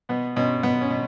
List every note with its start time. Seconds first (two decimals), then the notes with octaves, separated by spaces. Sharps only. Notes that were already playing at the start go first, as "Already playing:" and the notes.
0.09 B2 B3
0.36 B2 C#4
0.63 B2 B3
0.81 C#4
0.90 B2